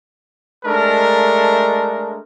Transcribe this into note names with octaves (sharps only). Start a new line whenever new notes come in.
G#3 A3 D4 A4 A#4